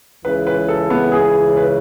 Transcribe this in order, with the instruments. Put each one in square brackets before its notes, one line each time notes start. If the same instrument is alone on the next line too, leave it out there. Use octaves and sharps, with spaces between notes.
[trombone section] C#2 C#3 E3 [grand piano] B4
[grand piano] B4
A4
B3
G#4
B4